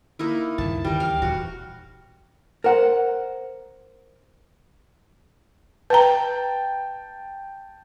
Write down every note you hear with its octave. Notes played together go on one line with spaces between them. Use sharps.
A#3 D#4 E4
C#2 G2 D#3 A5
D2 D#3 E3 G3 A#4
F5
D#1 E2 F#4
A#4 C5 F#5
B4 G5 A5 A#5